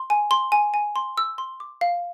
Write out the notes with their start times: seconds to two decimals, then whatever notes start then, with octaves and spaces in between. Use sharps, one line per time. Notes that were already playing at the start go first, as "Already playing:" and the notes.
Already playing: C6
0.10 G#5
0.31 C6
0.52 G#5
0.74 G#5
0.96 C6
1.18 E6
1.38 C6
1.60 D6
1.81 F5